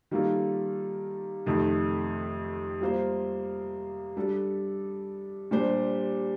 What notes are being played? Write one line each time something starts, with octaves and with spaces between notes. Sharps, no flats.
D#3 G3 A#3 F4 A4
F2 C3 D#3 A3
G3 A#3 F4 C5
G3 D4 A4
A#2 G3 D4 G4 C5